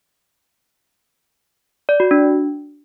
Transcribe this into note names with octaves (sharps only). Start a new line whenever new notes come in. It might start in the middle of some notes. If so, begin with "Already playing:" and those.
D5
F#4
D4